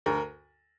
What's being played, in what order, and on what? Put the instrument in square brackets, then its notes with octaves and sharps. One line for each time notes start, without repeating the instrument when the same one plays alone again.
[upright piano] D2 A#4